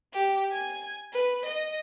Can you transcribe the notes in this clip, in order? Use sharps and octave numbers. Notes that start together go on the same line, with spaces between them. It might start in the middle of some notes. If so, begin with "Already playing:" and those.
G4
G#5 G#6
B4
D#5